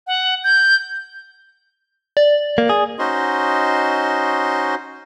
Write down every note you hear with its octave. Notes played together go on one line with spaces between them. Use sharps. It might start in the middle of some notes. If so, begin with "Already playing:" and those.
F#5
G6
D5
A#3
G#4
C#4 D#4 F#4 C5 D#5 C6